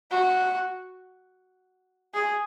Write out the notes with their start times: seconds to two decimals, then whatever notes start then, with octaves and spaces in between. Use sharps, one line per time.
0.11 F#4
2.14 G#4